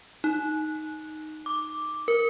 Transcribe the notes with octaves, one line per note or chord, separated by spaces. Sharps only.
D#4
D6
A#4